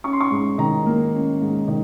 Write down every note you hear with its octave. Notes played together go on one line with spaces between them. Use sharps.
C#4 C#6
C6
C#6
G#2
D#3 A#5
A#3
C#4
G#2
D#3